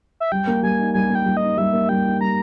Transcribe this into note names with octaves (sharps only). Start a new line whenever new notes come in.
E5
G3 G5
A#3
G3 G#5
D#4
G3 G#5
A#3
G5
G3
D#5
D#4
G3 E5
A#3
G3 G5
D#4
G3 A#5